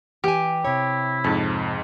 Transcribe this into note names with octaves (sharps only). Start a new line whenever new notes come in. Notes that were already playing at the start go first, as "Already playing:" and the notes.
E3 G4 F#5 G#5
C3 E4 C#5
F2 G#2 A5